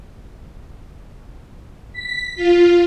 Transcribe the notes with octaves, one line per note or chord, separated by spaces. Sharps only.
B6
F4